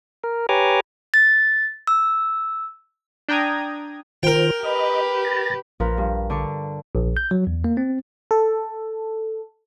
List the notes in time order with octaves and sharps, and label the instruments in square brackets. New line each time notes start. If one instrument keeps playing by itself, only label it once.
[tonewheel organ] A#4
G4 B4 C#5 G#5 A#5 D6
[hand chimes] A6
E6
[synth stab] D4 G5 A#5 D#6 G#6
[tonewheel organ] D#3 F4 C5 [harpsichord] A#4 G5
[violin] G4 B4 [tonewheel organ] D#5
[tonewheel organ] A6 A#6
[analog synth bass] A#1 [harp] F3 A#4 B4
[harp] G2
D3 D4 C#6
[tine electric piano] A#1
G6
F#3
E2
A#3
C4
[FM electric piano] A4